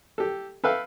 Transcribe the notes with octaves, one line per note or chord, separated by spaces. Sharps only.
G4 A4
A4 B4 E5 F5 G5